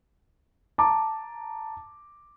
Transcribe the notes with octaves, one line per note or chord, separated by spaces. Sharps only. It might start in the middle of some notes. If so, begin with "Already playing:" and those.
A5 A#5 D6